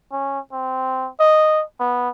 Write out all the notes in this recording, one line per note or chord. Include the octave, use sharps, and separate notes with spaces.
C#4
C4
D#5
B3